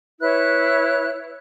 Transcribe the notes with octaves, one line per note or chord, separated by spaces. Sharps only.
E4 B4 C#5 F#6